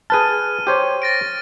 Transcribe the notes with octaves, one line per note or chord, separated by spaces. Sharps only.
G#4 B4 A5 F6 D#7
G4 C5 C#5
A6 A#6 D7